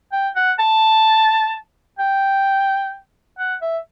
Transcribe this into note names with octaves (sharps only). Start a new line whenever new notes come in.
G5
F#5
A5
G5
F#5
E5